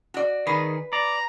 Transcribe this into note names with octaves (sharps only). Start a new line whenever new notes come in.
F#4 D5
D#3 G#4 B4
D5 A#5